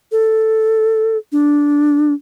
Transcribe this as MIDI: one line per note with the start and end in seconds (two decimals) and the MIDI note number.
0.12 1.17 69
1.32 2.14 62